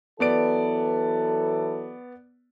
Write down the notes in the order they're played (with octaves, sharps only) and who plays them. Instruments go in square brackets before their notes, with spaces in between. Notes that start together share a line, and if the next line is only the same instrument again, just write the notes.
[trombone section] E3 F#3 A4 [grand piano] B3 D5 D7